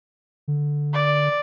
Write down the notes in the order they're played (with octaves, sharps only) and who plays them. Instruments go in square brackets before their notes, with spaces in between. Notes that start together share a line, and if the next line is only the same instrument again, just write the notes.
[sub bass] D3
[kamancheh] D5